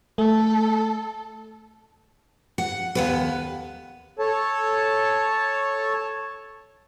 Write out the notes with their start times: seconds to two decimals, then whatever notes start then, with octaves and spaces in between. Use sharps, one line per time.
0.18 A3 A4
2.58 F#5
2.95 D#2 B3 B4
4.19 A4 C#5 A5